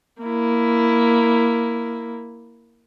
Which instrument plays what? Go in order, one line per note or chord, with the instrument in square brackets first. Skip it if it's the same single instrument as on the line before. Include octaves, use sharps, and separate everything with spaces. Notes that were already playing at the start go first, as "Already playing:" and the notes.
[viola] A#3 E4